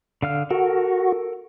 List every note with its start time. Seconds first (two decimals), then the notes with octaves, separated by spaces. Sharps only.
0.22 D3 F5 F6
0.50 F#4 A4 A#4